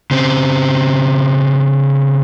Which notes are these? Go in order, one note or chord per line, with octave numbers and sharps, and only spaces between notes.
C#3 C4